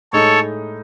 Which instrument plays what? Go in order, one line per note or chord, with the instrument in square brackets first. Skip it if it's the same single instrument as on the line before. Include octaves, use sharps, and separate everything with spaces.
[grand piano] A2 G#3 D#4 [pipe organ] A4 C#5